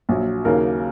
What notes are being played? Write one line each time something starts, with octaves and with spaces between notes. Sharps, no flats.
A#1 A#2 F#3
D#2 C#3 F#3 A#3 A#4